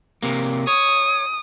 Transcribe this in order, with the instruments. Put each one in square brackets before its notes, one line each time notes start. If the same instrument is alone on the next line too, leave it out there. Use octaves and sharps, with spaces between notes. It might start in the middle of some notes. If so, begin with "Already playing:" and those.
[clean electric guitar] C3 A#3
[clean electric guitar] C#5 [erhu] D#6